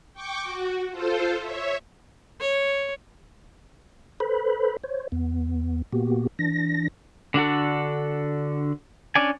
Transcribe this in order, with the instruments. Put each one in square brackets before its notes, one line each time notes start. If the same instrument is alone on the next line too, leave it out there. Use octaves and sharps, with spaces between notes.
[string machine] G5 C#6 D6
F#4
F4 A4 C5
C#5 E5
[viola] C#5
[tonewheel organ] A4 B4 C5 B5
C5 C#5
E2 B3
A#2 A#3 B3 F#4 G4
E3 D4 A#6
[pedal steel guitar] D3 D4 F#4 A4
C#4 D4 D5 G#5